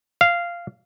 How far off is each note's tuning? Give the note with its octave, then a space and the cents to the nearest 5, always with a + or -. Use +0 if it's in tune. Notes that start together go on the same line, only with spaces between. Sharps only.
F5 -10